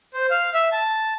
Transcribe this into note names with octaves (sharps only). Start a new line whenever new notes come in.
C5
F5
E5
A5